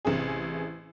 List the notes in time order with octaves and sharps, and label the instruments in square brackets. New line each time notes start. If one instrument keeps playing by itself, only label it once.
[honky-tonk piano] A1 C3 G#4